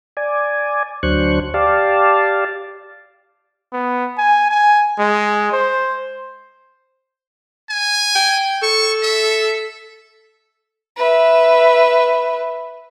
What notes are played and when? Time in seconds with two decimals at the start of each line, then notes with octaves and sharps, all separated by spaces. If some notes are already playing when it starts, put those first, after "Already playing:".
0.17 D5 G#5
1.03 D2 F#3 D4 C5 C#6 F#6
1.54 G4 D5 F5 A5
3.73 B3
4.18 G#5
4.51 G#5
4.99 G#3
5.52 C5
7.70 G#5
8.15 G5
8.63 A4 C#6
9.03 E5
10.97 B4 E5